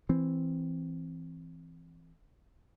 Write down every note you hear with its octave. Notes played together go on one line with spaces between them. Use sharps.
E3 C4